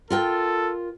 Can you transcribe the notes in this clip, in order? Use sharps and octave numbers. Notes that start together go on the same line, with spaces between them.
F4 A4 A#4 G5